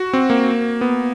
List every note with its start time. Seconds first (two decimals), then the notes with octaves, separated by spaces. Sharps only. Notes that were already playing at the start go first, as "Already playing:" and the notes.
Already playing: F#4
0.13 C4
0.30 A#3
0.81 B3